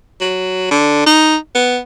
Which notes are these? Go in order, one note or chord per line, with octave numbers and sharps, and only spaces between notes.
F#3
D3
D#4
B3